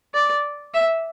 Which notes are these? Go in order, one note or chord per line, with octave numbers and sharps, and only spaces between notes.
D5
E5